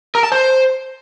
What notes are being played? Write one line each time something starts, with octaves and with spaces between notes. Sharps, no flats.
A#4
A5
C5